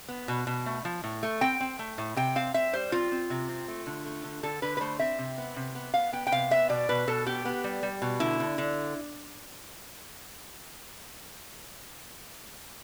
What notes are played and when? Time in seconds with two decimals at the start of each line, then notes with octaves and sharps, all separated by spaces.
0.09 B3
0.28 B2
0.47 B2
0.66 A3
0.85 F3
1.04 A2
1.23 A3
1.41 C4 G5
1.60 C4
1.79 A3
1.98 A2
2.16 C3 G5
2.36 C4 F5
2.54 C4 E5
2.73 G3 C5
2.92 C4 F4
3.12 C4
3.30 C3
3.48 C4
3.68 A3
3.86 D3
4.06 A3
4.24 D3
4.43 D3 A4
4.62 D3 B4
4.77 B4
4.81 A3 C5
4.99 C4 E5
5.19 C3
5.38 B3
5.56 C3
5.75 B3
5.94 B3 F5
6.12 B3 G5
6.27 G5
6.32 C3 F5
6.51 B3 E5
6.69 B2 D5
6.89 B2 B4
7.08 B2 A4
7.26 B3 G4
7.45 B3
7.64 G3
7.83 G3
8.02 B2
8.20 D3 E4
8.40 D3
8.58 D3